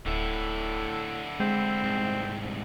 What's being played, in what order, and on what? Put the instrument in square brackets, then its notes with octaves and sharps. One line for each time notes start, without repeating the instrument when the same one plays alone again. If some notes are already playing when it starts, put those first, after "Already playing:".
[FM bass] D1 [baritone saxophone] A2 [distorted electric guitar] D3 E4
[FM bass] G#3 [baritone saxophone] C4
[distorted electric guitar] C2 G#2